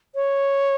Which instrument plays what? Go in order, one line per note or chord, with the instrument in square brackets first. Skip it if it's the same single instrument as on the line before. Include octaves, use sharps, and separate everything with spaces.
[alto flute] C#5